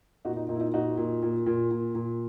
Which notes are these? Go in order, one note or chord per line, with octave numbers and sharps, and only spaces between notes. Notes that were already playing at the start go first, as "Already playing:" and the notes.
A#2 D#4 F#4
D#4
A#2 D#4
E4
D#4
A#2 D#4 F#4
A#2
A#2
A#2
A#2
A#2